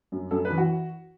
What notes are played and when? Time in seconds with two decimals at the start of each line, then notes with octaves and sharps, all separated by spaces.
0.12 F#2
0.31 F#2 A4
0.45 B4
0.50 E3
0.58 F#4